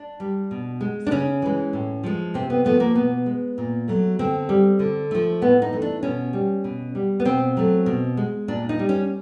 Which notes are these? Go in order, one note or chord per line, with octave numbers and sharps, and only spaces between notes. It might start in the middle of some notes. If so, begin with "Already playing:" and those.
Already playing: D4
G3
B2
G#3
D4
C#3 C#4
E3 G#3
A2
F3 G#3
C3 C4
B3
F3 A3 B3
A#3
B2 B3
G#3
A#2
F#3 A3
D3 C4
G3
D3
F3 A3
A2 B3
D#4
E3 A3
D4
B2 C#4
G3
B2
G3
B3
B2 C4
F#3 A3
B2
G#3
A#2 D4
D#4
G3
C#4